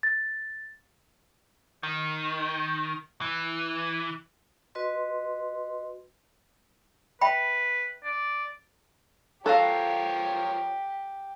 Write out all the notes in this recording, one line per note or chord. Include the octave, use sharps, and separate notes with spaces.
A6
D#3
E3
F#4 B4 D#5 C6
B4 E5 G5 B5
D5
F3 G4 A4 A#4 C#5 F5 A#5 F#6